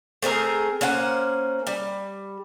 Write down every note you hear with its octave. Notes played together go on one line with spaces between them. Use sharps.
A3 C4 G#4 A#4
A#3 C#4 C5 F#5
G3